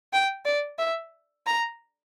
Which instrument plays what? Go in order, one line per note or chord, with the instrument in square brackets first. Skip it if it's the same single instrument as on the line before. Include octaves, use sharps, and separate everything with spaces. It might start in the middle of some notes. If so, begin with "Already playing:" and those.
[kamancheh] G5
D5
E5
A#5